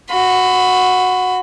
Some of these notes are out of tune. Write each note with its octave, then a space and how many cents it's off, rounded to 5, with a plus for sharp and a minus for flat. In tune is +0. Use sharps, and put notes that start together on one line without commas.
F#4 -10 B5 +25